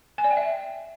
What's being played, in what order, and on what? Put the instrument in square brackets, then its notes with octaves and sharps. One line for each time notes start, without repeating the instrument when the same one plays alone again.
[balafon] G#5
D5
G5
E5